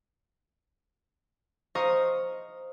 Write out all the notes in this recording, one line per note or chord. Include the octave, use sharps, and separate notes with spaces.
C5 D#5 F5 A#5 C#6